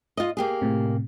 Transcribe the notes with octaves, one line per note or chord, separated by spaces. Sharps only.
F4 D#5
A#3 G4 G#4
A2 C3